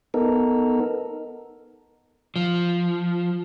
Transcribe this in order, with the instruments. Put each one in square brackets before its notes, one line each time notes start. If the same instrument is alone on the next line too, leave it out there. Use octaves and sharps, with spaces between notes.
[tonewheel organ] B3 D#4 A4 A#4
[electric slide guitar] F3